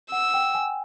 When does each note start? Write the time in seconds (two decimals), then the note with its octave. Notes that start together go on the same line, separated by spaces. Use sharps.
0.12 F#5 E6
0.34 G5
0.55 G#5